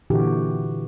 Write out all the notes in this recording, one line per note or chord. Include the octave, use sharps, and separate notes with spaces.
A#2 D3 E3 F#4 G4